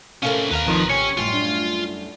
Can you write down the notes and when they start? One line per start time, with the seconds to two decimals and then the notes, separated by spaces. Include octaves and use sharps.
0.23 C3 A3 C#4 A4 A#4 F5
0.51 D#2 B4 F5 A#5
0.67 G#1 F2 D#3 F3
0.90 C3 C#4 C#5
1.17 F#2 A2 G3 F4
1.34 D4